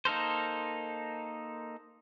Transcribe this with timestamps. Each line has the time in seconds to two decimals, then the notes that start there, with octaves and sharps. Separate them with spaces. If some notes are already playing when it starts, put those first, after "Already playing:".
0.05 A#3 D#4 A4 A#4 C5